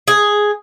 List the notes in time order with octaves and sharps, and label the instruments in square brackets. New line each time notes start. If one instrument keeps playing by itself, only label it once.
[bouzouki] G#4